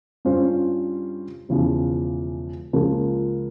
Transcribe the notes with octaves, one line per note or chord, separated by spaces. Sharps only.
G2 G3 C#4 F4 C5
E1 E2 C#3 F3
C#2 C#3 F3 A#3